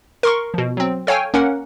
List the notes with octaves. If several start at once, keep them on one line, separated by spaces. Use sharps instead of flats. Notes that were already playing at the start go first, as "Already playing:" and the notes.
A#4 C6 C#6
B2 F3
F#3 C4
A4 C#5 F5 G5 G#5
A#3 C#4 A#4 F#5